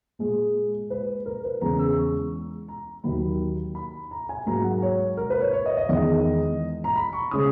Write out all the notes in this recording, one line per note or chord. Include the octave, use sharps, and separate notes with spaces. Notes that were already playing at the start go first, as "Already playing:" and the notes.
A#2 G#3
B4
A#4
B4
E2 C#3 G#3 A#5
E6
C#6
A#5
D#2 D#3 F#3 A#3 B5
B5
A#5
G#5
G#2 F#3 A#3 A#5
F#5
C#5
A#4
B4
C#5
C#5
D#5
D#5
E2 D#3 G#3 D#5
A#5
B5
C#6
C#3 G#3 D#6